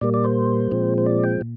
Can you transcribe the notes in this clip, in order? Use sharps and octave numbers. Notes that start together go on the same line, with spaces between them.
A#2 G3 A#3 D5
D5
C5
A#2 F3 G#3 C4
C5
D5
G5
A#2